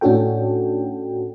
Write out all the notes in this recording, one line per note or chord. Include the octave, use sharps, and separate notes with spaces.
A2 C#4 D4 F#4 A4 G5